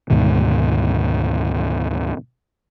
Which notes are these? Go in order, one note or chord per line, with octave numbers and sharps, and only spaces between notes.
D2 G#2 B2 D#3